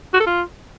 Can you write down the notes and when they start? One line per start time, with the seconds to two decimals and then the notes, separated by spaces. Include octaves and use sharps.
0.14 F#4
0.20 A4
0.26 F4